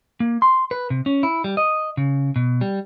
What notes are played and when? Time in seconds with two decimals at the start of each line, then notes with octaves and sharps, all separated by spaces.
0.20 A#3
0.42 C6
0.71 B4
0.90 C3
1.06 C#4
1.23 E4
1.44 G3
1.57 D#5
1.97 C#3
2.36 B2
2.61 G3